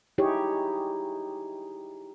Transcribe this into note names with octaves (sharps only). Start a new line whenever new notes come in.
D#4 E4 G4 G#4 C#5